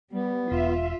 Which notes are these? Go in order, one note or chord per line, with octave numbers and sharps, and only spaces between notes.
G3 B3
E1 F4 E5